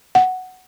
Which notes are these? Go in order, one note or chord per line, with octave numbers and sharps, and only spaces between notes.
F#5